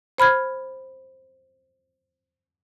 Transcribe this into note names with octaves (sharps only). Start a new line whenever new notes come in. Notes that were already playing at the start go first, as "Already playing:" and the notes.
C5 B5 F6 G#6